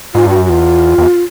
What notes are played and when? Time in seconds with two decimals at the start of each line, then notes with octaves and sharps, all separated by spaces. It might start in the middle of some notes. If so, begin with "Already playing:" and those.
0.14 G#2 F4
0.26 G2 F#4
0.38 F#2
0.46 F#4
0.49 E2 F4
0.98 E2